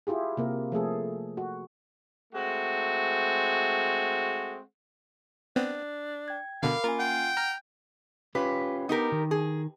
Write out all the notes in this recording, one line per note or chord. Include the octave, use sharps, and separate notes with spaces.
E4 F4 G4 G#4
C3 A#3 A#4
F3 A3 G#4 A4
F#4
G#3 A3 C4 F#4
B3 C4 D4
G5 G#6
B2 D3 A#4 F5 B5 D6
A#3 C#4 F4 A#4 G#5
F#5 G5
A#5 F6
C#4 F4 G4 B4
B3 D#4 G4 A#4
D#3
G#4